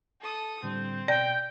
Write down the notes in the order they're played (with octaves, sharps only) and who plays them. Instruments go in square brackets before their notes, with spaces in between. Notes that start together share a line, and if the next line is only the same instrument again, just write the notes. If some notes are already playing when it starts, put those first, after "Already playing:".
[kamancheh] A4 D#6
[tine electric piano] A2 D3 G3 [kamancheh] C4
[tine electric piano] B2 [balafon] D5 [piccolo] G5